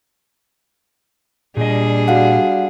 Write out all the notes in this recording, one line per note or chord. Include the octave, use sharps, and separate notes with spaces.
A#2 G3 D4 G#4 D#5
F#4 F5 F#5